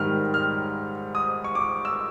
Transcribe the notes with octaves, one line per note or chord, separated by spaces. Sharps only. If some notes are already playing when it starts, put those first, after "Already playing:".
Already playing: G#2 D#3 G3 F6
F6
D#6
C#6
D6
E6